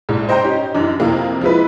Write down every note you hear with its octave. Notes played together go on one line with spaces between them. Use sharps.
A#1 G#2
C5 D#5 G5 A#5 G6
C#4 D#4 G4
F#2 E3 D4 D#4
F2 C3 E3 A#3
F3 G#3 E4 B4